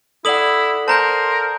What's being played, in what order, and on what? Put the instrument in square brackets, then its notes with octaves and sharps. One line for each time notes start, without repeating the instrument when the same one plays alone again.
[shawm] E4 [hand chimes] A4 D5 F#5 [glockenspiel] D#6 F#7
[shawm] A#4 [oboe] C5 [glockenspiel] A5 A#5 G6